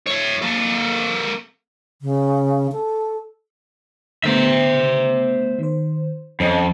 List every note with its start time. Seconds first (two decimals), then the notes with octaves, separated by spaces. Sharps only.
0.07 C#5 E5
0.42 A#3 A4
2.02 C#3
2.72 A4
4.24 D3 A3 B3 C5 E5
5.59 D#3 C5
6.40 F2 C#4 D#5 G#5